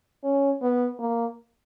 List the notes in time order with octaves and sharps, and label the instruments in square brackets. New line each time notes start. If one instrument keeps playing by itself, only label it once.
[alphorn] C#4
B3
A#3